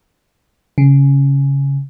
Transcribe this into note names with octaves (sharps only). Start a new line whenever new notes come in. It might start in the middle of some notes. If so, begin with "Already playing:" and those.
C#3